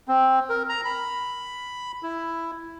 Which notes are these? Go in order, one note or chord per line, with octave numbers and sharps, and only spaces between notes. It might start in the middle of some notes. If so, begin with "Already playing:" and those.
C4
A#4
A#5
B5
E4